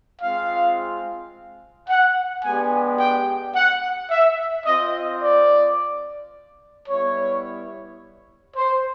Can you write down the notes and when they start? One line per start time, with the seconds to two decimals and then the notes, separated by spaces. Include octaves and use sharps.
0.22 G#3 C4 F4 F5
1.89 F#5
2.44 G#3 B3 D4 G4 G#5
3.00 G5
3.55 F#5
4.11 E5
4.66 C4 F4 D#5
5.22 D5
6.89 G3 B3 E4 C#5
8.56 C5